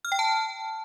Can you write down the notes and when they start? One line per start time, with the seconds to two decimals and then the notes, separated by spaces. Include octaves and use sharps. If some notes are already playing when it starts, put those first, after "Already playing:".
0.05 F6
0.12 G5
0.19 A5